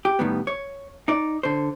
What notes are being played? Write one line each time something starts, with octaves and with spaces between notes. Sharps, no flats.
G4
A2 D#3 G3 B3
C#5
D#4 D5
D3 C5